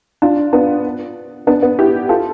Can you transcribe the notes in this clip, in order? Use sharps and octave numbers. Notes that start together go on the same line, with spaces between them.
D4 F4
B3 D4
B3 D4
B3
E4 G4
F4 A4